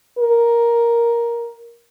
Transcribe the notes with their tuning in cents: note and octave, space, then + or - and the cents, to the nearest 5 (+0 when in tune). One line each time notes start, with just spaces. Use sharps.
A#4 +10